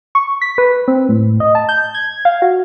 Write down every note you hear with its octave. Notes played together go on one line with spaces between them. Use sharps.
C#6
B6
B4
C4
A2
D#5
A5
G6
G#6
F5
F#4